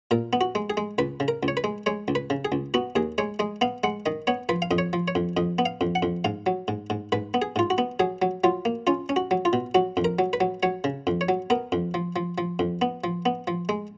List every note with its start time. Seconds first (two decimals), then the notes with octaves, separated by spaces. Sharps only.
0.11 A#2 A#4
0.33 B3
0.41 F#4
0.55 G#3
0.70 G#4
0.77 G#3
0.98 C#2 B4
1.20 C#3
1.28 A#4
1.43 C#2
1.48 C#5
1.57 B4
1.64 G#3
1.86 G#3 C#5
2.08 C#2
2.15 B4
2.30 C#3
2.45 G#4
2.52 C#2
2.74 B3 F#4
2.96 D#2 G#4
3.18 G#3 C#5
3.39 G#3 D#5
3.61 B3 F5
3.84 G#3 F#5
4.06 D#3 D#5
4.27 B3 C#5
4.49 F3 B4
4.62 F5
4.71 F2 D#5
4.78 C#5
4.93 F3
5.08 C#5
5.15 F2
5.37 F2 D#5
5.59 B3
5.66 F5
5.81 F2
5.95 F#5
6.02 F2
6.24 G#2 F5
6.46 F#3
6.68 G#2
6.90 G#2
7.12 G#2 B4
7.34 B3
7.42 G#4
7.56 G#2 F4
7.70 F#4
7.78 B3
8.00 F#3 G#4
8.22 F#3
8.44 F#3 F4
8.65 A#3
8.87 C#4 F4
9.09 C#4
9.16 F#4
9.31 F#3
9.45 F4
9.53 B2
9.75 F#3 F#4
9.97 F2
10.05 A#4
10.19 F#3
10.33 B4
10.40 F#3
10.63 F#3 C#5
10.84 C#3
11.07 F2
11.21 C#5
11.29 F#3
11.50 B3 A#4
11.72 F2
11.94 F3
12.16 F3
12.38 F3
12.59 F2
12.82 B3
13.04 F3
13.26 B3
13.47 F3
13.69 G#3